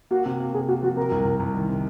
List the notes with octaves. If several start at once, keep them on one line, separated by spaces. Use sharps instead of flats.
A#3 F#4
C3
A#3
C3 G#4
A#3 F#4
F3 F#4
C3 A#4
C2
C2
C2
D#3
C3